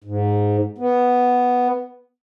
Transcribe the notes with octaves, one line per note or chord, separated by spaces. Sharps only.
G#2
B3